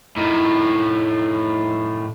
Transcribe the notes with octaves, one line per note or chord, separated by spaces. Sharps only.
A2 D#3